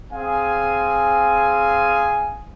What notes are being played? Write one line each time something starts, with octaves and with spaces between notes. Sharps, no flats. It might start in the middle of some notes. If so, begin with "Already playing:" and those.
C4 G#4 F5 G#5